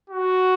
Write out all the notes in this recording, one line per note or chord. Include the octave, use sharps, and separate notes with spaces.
F#4